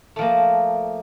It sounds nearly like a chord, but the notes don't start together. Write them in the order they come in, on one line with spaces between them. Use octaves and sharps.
A3 F3 A#3